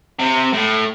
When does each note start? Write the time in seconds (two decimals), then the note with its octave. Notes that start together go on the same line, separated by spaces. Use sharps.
0.19 C3
0.53 A2